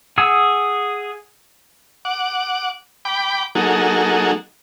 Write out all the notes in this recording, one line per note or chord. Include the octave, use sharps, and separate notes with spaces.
G#4 F#5 G#5 D#6 E6
F#5 D6
G5 B5 D6
F#3 A#3 D#4 F#4 G#4 A4